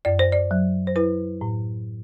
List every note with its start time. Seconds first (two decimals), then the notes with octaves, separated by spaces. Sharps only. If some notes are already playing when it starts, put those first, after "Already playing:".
0.05 F#2 D5
0.19 C5
0.32 D5
0.51 F#3
0.87 C5
0.96 E4 B4
1.41 A2